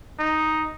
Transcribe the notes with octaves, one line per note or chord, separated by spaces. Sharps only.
D#4